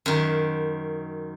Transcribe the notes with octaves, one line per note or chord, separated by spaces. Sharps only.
F#2 D#3